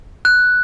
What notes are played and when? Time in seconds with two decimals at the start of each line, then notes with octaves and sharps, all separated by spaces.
0.25 F#6